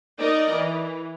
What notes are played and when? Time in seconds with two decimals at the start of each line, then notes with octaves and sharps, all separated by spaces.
0.20 D#4 A#4 D5 D#5
0.54 E3